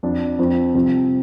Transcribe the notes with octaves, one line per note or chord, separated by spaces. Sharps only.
F2 F3 D4
F2 F3 C4
C2 C3 F3 C4